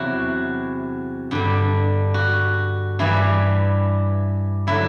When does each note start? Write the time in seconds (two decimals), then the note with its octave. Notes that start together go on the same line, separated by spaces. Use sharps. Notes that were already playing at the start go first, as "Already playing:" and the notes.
Already playing: E2 C3 F#3 E4 F#4
1.31 G2 D3 G3
2.14 F#4
2.99 G2 E3 G3 E4
4.67 D3 F#3 E4